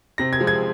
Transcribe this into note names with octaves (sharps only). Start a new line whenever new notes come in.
C3 A#6
G#6
F3 G#3 C4
G#6